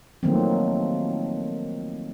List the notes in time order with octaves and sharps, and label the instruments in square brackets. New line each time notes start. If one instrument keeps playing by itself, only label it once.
[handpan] D#3 F3 F#3 A3 A#3 C4